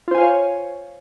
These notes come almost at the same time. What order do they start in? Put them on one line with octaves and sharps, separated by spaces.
F4 C5 G#5 F5 C#5